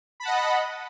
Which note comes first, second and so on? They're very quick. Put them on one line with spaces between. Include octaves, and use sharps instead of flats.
B5 A5 F#5 D#5